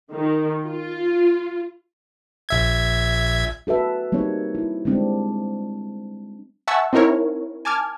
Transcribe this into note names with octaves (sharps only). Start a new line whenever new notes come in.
D#3
F4
A#1 E5 G#6
F#4 A4 B4 E5
G3 A#3 C4 D#4 C#5
E4
G3 G#3 C4 D4
E5 F#5 G#5 A5 C#6 E6
C4 D#4 E4 A#4 C#5
G#5 A5 D6 F6 G#6